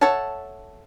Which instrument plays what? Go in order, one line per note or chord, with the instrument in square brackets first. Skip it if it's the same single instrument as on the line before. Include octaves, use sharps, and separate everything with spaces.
[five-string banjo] A4 C#5 E5 F#5 A5